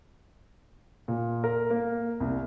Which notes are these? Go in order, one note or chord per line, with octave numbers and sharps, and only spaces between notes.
A#2
A#4
A#3
C2